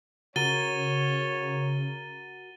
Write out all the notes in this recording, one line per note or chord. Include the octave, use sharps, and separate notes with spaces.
C#3 F#4 A#4 C#5 A6 D#7 G7